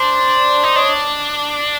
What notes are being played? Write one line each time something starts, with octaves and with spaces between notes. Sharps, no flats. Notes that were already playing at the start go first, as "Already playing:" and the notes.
Already playing: D4 C5 D5
D#4
D4 C#5 D#5